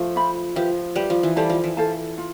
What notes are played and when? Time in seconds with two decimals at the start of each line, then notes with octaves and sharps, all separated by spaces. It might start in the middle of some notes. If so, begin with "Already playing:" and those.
Already playing: F3 A3
0.16 F4 C5 E5 B5
0.56 F3 G4 B4 E5
0.96 G3 G4 B4 E5
1.10 F3
1.23 E3
1.36 G3 A4 C5 F5 A5
1.49 F3
1.64 E3
1.77 A4 C5 F5 A5
2.18 F4